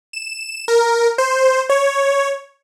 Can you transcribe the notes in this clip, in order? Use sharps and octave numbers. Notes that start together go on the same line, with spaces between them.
E7
A#4
C5
C#5